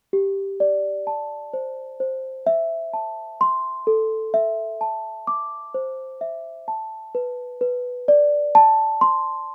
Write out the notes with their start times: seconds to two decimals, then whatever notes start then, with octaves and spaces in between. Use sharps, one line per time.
0.13 G4
0.60 D5
1.07 A5
1.53 C5
2.00 C5
2.47 E5
2.93 A5
3.41 C6
3.87 A4
4.34 E5
4.81 A5
5.27 D6
5.74 C5
6.21 E5
6.68 A5
7.15 B4
7.61 B4
8.08 D5
8.55 A5
9.01 C6